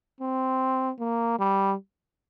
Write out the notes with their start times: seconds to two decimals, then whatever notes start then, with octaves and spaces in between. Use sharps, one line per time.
0.20 C4
0.99 A#3
1.39 G3